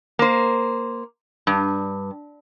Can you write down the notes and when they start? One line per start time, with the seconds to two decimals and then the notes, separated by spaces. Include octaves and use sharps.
0.19 A#3 C5
1.47 G2